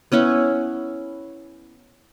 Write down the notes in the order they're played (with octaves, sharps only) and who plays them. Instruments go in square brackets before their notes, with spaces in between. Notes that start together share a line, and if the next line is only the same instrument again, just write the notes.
[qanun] B3 C#4 E4 F#5